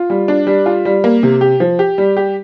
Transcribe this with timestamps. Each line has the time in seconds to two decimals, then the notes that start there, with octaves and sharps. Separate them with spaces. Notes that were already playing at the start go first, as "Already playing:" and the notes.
Already playing: F4
0.10 G3
0.28 D4
0.47 G3
0.66 F4
0.85 G3
1.04 A#3
1.23 C3
1.41 G4
1.60 F3
1.79 G4
1.98 G3
2.17 G4